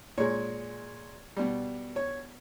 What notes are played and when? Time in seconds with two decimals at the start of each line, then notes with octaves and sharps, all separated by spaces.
0.18 A#2 G#3 C#5
1.37 B2 G3
1.96 C#5